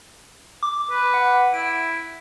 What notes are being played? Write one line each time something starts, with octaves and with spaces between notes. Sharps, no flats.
D6
B4
F#5
E4 D7